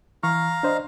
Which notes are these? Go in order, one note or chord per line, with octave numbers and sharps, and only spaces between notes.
E3 F5 A#5 C#6 F6
D4 C5 D#5